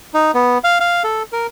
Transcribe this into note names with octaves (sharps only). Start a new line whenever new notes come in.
D#4
B3
F5
F5
A4
A#4